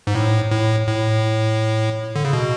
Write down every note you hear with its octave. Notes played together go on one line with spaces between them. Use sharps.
G#2
A2
A2
A2
D3
C#3
B2